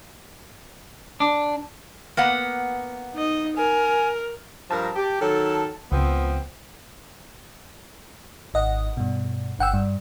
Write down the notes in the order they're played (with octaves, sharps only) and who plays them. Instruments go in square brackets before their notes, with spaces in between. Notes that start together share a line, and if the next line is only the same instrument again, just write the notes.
[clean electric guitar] D4
[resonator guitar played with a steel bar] A#3 B3 F#5
[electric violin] D#4 D#5
[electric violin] A#4 [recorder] G#5
[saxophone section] G2 F3 A#4 [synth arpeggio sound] A5
[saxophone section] G4
D#3 F#3 A4
[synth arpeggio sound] C#2 [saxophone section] F3 B3 C4
[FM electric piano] G#1 D#5 F#5
G2 B2
G1 F#5 G5 E6
G2